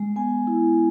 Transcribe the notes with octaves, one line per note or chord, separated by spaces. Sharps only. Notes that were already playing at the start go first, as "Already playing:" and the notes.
Already playing: G#3
B3 G#5
E4